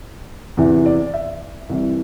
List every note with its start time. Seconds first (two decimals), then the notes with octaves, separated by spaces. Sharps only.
0.57 E2 C3 E3
0.86 D5
1.14 E5
1.69 C2 C3 E3